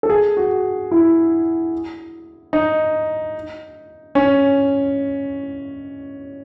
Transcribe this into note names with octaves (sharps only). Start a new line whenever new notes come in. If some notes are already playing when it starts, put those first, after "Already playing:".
A4
G#4
F#4
E4
D#4
C#4